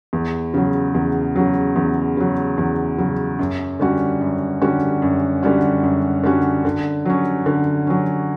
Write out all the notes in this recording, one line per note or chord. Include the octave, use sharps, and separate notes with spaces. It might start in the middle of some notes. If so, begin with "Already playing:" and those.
E2
C#3 F#3
E2
C#3 F#3
E2
C#3 F#3
E2
C#3 F#3
F#2
D3 G3 C#4 F#4
F#2
D3 G3 C#4 F#4
F#2
D3 G3 C#4 F#4
F#2
D3 G3 C#4 F#4
D3
F#3 C#4
D3
F#3 C#4